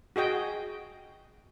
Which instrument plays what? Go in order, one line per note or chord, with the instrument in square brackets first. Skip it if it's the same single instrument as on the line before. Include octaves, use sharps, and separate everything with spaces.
[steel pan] F#4 G#4 D#5 G5